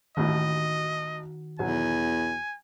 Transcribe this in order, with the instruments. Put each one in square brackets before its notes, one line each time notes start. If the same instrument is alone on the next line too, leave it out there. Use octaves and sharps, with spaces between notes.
[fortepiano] A1 D#2 A2 [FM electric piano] D#3 F#4 [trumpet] D#5
[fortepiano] B1 F#3 [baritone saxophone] E2 [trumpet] G#5